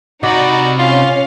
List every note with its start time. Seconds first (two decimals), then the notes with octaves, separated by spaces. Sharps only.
0.23 C3 D#4 F#4 D5 D#5 B5 D6
0.79 C#4 F4 F5